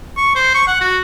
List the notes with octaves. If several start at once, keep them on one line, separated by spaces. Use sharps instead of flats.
C#6
C5
C#6
F#5
F#4